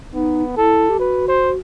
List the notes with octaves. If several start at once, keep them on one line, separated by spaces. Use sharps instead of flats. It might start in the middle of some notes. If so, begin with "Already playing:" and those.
B3 D#4
E4 A4
G4
F#4 B4
C5